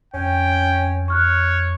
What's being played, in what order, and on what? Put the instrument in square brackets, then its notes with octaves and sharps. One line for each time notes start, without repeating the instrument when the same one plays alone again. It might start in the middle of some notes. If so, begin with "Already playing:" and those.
[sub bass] F2 [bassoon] C#4 [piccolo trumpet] G5
[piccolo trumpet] C#5 [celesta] C#6 F6 F#6